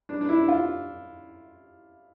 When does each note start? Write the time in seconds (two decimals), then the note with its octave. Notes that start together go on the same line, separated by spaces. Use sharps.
0.09 D4
0.21 D4
0.29 E4
0.48 F4